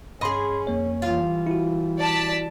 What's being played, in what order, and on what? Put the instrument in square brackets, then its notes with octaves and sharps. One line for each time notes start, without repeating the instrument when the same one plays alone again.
[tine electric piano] G2 B5 C6 [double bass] C#4 [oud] G#4 D#5
[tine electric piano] F2 A#3 C#5
[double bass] E3 G3 [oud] F4
[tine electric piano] E4 F#4
[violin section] D5 A5 B6